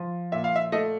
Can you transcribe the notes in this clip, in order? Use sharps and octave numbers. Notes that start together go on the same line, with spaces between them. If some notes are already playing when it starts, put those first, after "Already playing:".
Already playing: F3
A#2 E5
F5
E5
A3 D#5